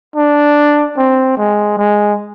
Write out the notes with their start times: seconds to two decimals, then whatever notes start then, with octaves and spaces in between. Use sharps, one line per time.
0.16 D4
0.97 C4
1.37 G#3
1.78 G#3